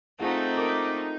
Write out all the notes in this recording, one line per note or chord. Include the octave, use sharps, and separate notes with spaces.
A3 C4 D#4 F4 G#4 F#5
A#4 D6